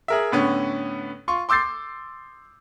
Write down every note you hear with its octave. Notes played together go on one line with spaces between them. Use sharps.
G#4 A#4 E5
A2 D3 B3 C#4
F4 C6 C#6
C6 D6 E6 G6 A6 C7